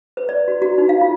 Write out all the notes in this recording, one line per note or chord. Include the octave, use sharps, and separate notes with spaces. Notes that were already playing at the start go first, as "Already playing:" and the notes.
B4
D5
F#4
F#4
D#4
F5
F4